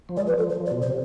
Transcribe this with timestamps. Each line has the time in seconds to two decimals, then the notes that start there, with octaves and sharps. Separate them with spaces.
0.09 F3
0.17 G#3 D5
0.27 F3 B4
0.38 F3 A4
0.50 C5
0.60 F3
0.66 D5
0.71 B2
0.81 C3 C5